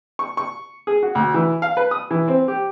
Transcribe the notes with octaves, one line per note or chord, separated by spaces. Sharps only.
C#6
C#6
G#4
F#4
D2
E3
F5
B4
D#6
E3
C4
G4